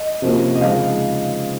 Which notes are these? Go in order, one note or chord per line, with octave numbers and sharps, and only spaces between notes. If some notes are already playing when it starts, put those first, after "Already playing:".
Already playing: D#5
C3 F3 A#3 C#4
D#5
C#3 F3 G#3 D#4 F5